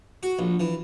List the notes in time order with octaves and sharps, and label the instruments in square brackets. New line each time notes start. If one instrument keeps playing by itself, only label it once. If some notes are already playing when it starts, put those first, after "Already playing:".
[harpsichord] F#4
A#1
E3